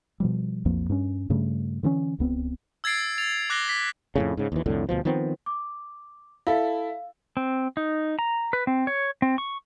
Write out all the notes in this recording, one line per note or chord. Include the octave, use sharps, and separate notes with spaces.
B2 F3 G3
B1 F2 F3 A#3
G2 C#4
G2 C#3 G3 A3
D3 E3 C4 C#4
D1 C#2 B3 C4
E6 G#6 A6 C7 D7
A6 F7
D6 F#6 A#6 C7 F#7 G7
B6
F2 A2 C#3
G#2 C#3
D#2 E3
C2 F2 A2 D3
D2 B2 F3
D#3 F3 B3 C4
D6
E4 A4 F5
C4
D#4
A#5
B4
C4
C#5
C4
C#6